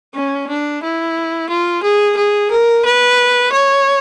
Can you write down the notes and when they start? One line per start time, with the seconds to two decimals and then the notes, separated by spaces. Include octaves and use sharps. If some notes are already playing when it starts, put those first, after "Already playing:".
0.15 C#4
0.49 D4
0.83 E4
1.49 F4
1.83 G#4
2.17 G#4
2.51 A#4
2.85 B4
3.52 C#5